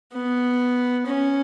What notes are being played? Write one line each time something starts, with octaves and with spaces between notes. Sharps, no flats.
B3
C#4